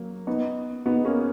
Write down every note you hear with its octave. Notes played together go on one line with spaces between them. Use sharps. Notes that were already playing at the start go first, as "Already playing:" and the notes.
Already playing: F#3 A#3
B3 D#4
B3 D#4
A#3 C#4